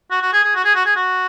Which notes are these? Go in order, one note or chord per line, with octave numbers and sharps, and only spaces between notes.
F#4
F#4
G#4
G#4
F#4
G#4
F#4
G#4
F#4